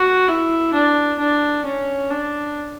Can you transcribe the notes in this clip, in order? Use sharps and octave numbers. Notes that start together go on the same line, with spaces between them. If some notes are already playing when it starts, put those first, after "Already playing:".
Already playing: F#4
E4
D4
D4
C#4
D4